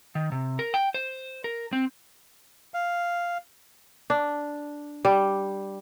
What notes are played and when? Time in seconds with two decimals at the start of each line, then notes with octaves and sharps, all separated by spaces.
0.15 D#3
0.32 C3
0.59 A#4
0.74 G5
0.94 C5
1.44 A#4
1.73 C4
2.74 F5
4.10 D4
5.05 G3